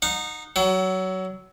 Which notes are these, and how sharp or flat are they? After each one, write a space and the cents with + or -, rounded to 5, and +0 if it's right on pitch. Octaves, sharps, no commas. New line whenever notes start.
D#4 -15 F#5 -25
F#3 +20 F#5 +40